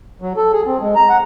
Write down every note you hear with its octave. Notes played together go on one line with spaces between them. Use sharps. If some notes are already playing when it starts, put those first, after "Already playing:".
F#3
A4
G#4
C4
G#3
A#5
F#5